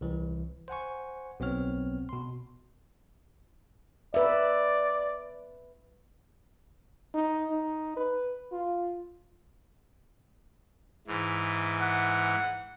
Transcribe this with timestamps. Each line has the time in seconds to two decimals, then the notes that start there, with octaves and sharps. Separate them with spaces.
0.01 C2 E3
0.68 C5 F#5 G#5 C#6
1.40 B1 B3 C4 C#5 F6
2.09 B2 C6
4.14 B4 D5 E5
7.14 D#4
7.51 D#4
7.97 B4
8.52 F4
11.07 G#2 E3
11.81 F#5